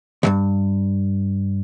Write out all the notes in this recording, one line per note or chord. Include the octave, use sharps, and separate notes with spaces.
D2 G2